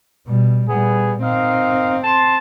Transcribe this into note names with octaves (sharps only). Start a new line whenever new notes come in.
B2 G3
A#2 G3 B3 G#4
D#3 C4 D#4 F5
A5 C6